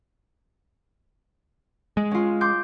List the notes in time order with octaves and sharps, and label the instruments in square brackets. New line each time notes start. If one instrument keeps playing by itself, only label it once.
[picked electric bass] G#3
[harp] C#4 F4
C6 D6 G6